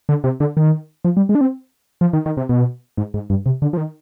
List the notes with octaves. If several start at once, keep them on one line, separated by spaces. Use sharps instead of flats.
D3
C3
D3
D#3
F3
G3
G#3
D4
C4
F3
D#3
D#3
C3
B2
G#2
G#2
G2
C3
D3
F3
D#3